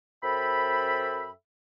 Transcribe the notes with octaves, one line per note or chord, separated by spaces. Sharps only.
F#2 A4 C5 E5 G5 B5